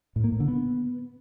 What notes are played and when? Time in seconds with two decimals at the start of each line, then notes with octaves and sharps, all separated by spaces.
0.16 A2
0.24 A#3
0.32 A2
0.40 D3
0.48 B3